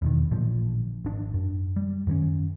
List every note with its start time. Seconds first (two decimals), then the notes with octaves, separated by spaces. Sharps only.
0.02 E2 B2 D#3
0.31 A1 A#2 D3 F3
1.04 G#1 D4
1.34 F#2
1.76 G3
2.07 F#2 D#3 C4 C#4